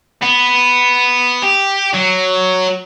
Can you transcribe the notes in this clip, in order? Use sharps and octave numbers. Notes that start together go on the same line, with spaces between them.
B3
G4
F#3